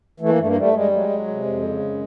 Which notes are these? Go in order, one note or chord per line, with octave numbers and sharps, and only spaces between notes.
E3 A3
A#3
G2 A3
A#3
G3 A3
G3 G#3
F#3 G#3
F#3
C3
F2
C#3
F#2